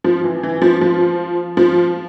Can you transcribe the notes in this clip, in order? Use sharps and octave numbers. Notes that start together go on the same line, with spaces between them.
F3
E3
E3
F3
F3
F3